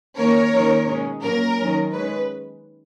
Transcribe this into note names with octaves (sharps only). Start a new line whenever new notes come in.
D#3 A#3 C#4 A#4 C#5
D#3 A#3 C#4
B2 G#3 C#4
A#2 F#3 A#3 C#4 A#4
D#3 F#3 C#4
D#3 G#3 C#4 B4